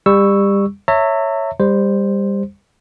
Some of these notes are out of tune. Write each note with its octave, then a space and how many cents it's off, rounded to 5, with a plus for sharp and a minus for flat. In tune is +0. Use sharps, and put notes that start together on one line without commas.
G3 +25 C#6 +0 E6 +0
C#5 +0 E5 +0 A#5 -45
G3 +25 C5 +0